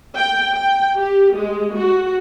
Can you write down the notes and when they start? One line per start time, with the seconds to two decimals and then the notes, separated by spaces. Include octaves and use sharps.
0.17 G5
0.54 G5
0.97 G4
1.35 G#3
1.77 F#4